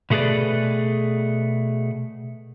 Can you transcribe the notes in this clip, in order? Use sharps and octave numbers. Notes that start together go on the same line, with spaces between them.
B2 A3 G#4 B4 D5